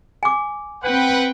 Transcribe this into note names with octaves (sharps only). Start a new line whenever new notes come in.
G#5 D6
C4 B4 F#5 G5